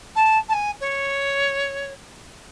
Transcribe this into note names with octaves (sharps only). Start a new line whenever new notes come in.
A5
A5
G#5
C#5